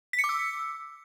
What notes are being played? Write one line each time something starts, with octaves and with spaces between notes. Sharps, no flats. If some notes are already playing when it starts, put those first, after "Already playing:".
B6
C#7
D6
E6